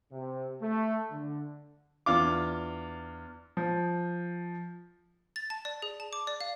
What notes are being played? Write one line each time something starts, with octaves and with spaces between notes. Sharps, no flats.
C3
A3
D3
E2 D4 F4 D6
F3
A6
A5
D5
G#4
A5
D6
D5
F5